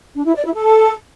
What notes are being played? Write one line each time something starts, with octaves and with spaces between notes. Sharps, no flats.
D4
E4
D5
E4
A4